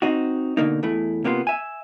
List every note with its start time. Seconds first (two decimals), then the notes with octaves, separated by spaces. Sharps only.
0.02 C4 D#4 F#4
0.57 B2 D3 A#3 D#4
0.83 E2 A3 E4
1.24 C3 A#3 B3 C#4 F4
1.47 E5 G#5